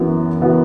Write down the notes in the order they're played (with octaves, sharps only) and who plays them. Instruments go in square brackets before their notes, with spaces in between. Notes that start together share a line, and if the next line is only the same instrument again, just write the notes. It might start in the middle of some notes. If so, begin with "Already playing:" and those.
Already playing: [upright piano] F#2 E3 B3 F#4
E3 B3 F#4